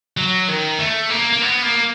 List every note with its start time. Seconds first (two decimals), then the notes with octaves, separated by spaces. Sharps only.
0.17 F#3
0.48 D#3
0.78 A3
1.10 A#3
1.33 A#3
1.42 B3
1.63 A#3